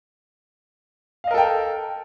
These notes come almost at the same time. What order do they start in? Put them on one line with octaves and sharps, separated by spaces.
F5 D#5 A#4 A4 G5